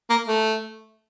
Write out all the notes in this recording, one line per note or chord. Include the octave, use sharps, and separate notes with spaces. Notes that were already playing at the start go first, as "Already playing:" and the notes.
A#3
A3